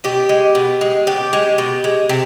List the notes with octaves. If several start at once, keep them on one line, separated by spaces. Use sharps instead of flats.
B2 G4
G#3
B2
G#3
B2 G4
G#3
B2
G#3
C3 C4